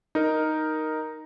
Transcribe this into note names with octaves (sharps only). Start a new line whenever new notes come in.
D#4 A#4